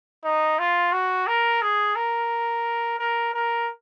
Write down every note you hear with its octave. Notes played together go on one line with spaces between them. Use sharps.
D#4
F4
F#4
A#4
G#4
A#4
A#4
A#4